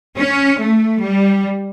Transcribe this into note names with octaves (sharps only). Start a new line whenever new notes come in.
C#4
A3
G3